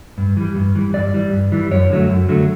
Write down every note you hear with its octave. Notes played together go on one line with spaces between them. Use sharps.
G2
E3 G3
G2
E3 G3
G2 D5
E3 G3
G2
E3 G3
F#2 C#5
D3 F#3 A3
F#2
D3 F#3 A3